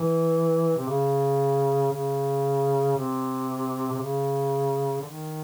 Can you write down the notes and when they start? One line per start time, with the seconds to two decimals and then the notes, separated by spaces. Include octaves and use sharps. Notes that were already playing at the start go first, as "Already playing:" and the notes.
Already playing: E3
0.77 C3
0.88 C#3
1.93 C#3
2.97 C3
3.92 C3
4.01 C#3
5.01 D3
5.06 D#3